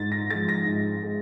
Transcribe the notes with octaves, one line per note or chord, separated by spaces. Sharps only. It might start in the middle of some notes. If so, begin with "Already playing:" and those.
Already playing: G#2 A6
A#6
F3 G#3 A6
A#6
G#2
G#3